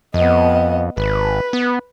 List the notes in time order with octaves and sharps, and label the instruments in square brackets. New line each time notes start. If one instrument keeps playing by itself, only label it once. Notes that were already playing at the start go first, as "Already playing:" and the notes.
[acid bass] F2 [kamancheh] B3 D#5
[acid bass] G#1 [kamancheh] B4
[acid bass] B3